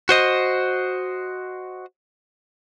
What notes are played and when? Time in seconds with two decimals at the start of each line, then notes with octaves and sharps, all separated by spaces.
0.09 F#4 C5 D#5